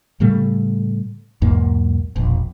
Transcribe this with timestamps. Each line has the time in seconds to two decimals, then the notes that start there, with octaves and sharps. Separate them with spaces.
0.20 A2 C#3 G3 A3
1.42 B1 E2 G#2 A#3
2.16 E1 A#1